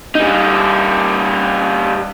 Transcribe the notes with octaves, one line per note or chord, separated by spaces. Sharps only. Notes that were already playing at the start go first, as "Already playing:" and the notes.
G3 D#4